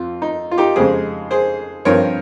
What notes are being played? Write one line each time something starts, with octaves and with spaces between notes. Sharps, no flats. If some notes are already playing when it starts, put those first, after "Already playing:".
Already playing: F2 C4 F4
D#4
F4
D#4 G4
F2 C#3 G#3 G#4 C5
G#4 C5
G2 F3 C4 A#4 C#5